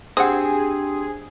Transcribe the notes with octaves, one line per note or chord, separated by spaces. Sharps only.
C4 D4 G4 G#4 F#5 G#5 D#6